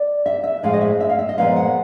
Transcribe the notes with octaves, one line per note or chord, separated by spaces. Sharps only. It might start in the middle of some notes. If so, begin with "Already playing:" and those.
Already playing: D5
E5
E5
A2 F3 G#3 F5
D#5
E5
E5
F5
E5
D#5
A#2 F3 G#3 B3 F5
F#5